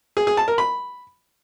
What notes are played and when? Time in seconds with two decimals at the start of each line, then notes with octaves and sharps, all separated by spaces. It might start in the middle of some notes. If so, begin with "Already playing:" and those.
0.17 G#4
0.27 G#4
0.37 A5
0.48 A#4
0.58 B5